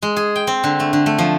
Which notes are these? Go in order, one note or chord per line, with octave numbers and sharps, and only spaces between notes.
G#3
G#4
G5
C4
D3
A3
D3
A3
F3